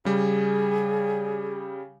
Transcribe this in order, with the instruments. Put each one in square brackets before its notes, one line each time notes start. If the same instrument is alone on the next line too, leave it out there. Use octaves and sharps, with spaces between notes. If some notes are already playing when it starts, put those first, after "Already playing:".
[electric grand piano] C#3 G3 [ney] G#4